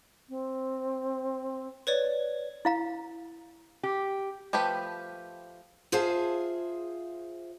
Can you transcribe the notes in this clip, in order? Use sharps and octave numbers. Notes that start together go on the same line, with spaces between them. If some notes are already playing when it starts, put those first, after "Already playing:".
C4
B4 C#5 D5
E4 F5 A#5
G4
F3 A3 G4 B4
F4 G#4 C5 E5 F5 A5